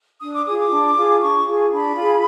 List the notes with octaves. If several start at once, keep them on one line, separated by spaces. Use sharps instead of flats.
D4 D#6
D6
F4 G#4 D#6
D6
D4
F4 G#4
D4 C#6
F4 G#4
D4 B5
F4 G#4